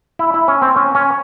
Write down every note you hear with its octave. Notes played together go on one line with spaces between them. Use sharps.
E4
E4
C#4
C4
C#4
C#4